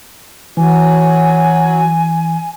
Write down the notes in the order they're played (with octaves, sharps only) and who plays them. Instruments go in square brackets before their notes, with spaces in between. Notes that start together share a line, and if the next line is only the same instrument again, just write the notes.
[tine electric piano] E3 [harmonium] F#3 [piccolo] G#5